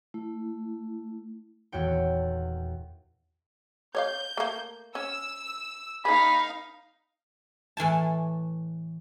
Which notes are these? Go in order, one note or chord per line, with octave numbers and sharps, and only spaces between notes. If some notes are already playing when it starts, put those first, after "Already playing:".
A3 E4
D#1 E2 F#4 C#5 G5
C#5 D5 F5 G6
A3 A#3
C#4 E6
A#3 D#4 G#4 F5 B5
A2 E3 G#5 A5